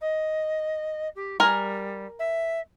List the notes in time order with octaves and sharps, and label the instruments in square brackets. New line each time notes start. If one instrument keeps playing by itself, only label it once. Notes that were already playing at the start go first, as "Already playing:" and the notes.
[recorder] D#5
G4
[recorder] G3 [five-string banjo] A#4 G#5
[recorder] E5